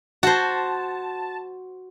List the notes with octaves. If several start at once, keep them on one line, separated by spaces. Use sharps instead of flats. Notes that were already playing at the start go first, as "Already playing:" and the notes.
F#4 C5 A5